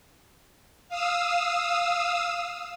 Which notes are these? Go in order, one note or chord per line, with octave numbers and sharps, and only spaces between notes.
F5 D#6 E6